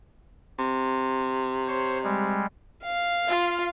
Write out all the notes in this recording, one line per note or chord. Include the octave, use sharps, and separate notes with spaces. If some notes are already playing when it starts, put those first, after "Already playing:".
C3
C5 C#5
G3 G#3
F5
F4